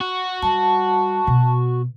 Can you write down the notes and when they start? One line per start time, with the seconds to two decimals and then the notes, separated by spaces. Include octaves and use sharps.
0.01 F#4
0.43 G3 A5
1.27 B2